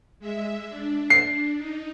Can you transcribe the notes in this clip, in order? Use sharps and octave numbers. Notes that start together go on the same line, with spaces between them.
G#3 E5
D4
C7
D#4